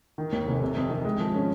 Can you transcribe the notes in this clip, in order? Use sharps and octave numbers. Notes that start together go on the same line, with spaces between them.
D#3
D#2
F1
C3
F2
D#3
G#3
F3
C#4